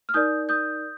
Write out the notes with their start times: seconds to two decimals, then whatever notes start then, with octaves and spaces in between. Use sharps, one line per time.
0.09 F6
0.14 D#4 A#4 D5 D#6 G6
0.49 D#6 G6